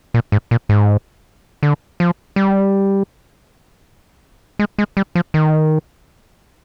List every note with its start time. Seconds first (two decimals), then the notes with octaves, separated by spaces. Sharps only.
0.14 A#2
0.32 G#2
0.51 A#2
0.69 G#2
1.63 D3
2.00 F3
2.36 G3
4.59 G#3
4.78 G#3
4.97 G3
5.15 F3
5.34 D#3